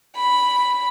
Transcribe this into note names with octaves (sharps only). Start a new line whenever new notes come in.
B5